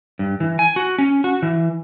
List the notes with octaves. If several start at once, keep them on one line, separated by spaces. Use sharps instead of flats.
G2
E3
G#5
F#4
C#4
F#4
E3